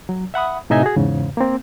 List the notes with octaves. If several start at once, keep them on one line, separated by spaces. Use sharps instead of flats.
F#3
E5 F#5 B5 D#6
A2 C3 D#4 D#5 E5 G#5
F#4 G#4
E2 G#2 C#3
A#3 C4